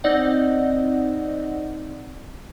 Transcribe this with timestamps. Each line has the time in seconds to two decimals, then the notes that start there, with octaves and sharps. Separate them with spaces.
0.04 C4 D#4 D5 D#5 F#5